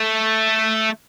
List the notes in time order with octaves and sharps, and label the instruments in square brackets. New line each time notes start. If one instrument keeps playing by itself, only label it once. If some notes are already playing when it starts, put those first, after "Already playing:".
Already playing: [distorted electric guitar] A3